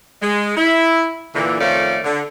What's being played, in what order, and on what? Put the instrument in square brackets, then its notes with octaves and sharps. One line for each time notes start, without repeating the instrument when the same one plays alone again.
[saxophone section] G#3
E4
A#2 D3 E3
F2 D#3 A3 C#4 D5 F5
D3